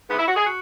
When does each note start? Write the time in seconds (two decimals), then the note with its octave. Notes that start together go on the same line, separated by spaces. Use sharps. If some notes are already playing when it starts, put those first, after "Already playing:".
0.10 G#2 E3 B3
0.19 E4
0.28 F#4
0.36 G#4
0.46 F#4